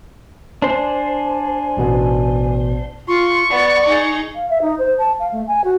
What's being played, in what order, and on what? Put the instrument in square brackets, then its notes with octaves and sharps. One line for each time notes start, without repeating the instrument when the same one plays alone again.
[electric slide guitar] D4 C5 [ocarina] G#5
[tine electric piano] A1 B2 B3
[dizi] F4 [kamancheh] C6 [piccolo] C#6
[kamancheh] B3 [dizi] D5
[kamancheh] D#4 G#4
[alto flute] F5
E5
D#4
C5
A5
F5
A3
G#5
F#4